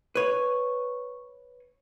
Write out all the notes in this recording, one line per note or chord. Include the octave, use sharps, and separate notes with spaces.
B4 C#5